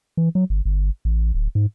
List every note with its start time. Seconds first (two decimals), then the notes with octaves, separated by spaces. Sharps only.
0.17 E3
0.35 F#3
0.50 G1
0.65 G1
1.05 A1
1.34 D1
1.55 G#2